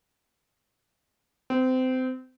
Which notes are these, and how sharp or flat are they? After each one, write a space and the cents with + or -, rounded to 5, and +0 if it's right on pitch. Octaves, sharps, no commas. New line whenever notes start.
C4 -25